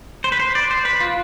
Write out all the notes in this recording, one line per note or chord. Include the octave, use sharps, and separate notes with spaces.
C5
B4
C5
D5
C5
B4
F4